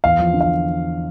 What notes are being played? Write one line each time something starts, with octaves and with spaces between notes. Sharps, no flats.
E2 F5
F3
D3
F5